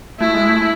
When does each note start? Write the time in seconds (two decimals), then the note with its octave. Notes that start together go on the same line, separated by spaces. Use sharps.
0.19 A3 E4
0.34 G#3
0.48 A3